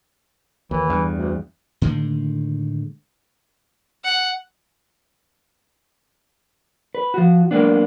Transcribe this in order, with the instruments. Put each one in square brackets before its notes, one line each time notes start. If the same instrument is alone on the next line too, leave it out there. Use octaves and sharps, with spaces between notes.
[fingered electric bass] D#2 [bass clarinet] E3
[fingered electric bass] E2 G2
[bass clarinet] D2
[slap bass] A2 D3 D#3 G#3
[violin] F#5
[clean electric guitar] B4
F3 F#4
F#3 G#3 A#3 B3 D4